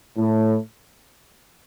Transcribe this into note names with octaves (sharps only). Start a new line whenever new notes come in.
A2